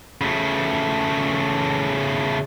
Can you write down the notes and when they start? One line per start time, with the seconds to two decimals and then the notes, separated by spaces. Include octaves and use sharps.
0.21 C#3 A3